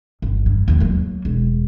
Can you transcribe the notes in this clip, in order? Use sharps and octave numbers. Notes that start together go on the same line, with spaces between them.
G1
G2
D#2 F3
F#3 A#3
E1